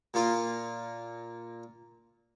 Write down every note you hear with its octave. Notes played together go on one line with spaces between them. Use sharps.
A#2 A#3 F4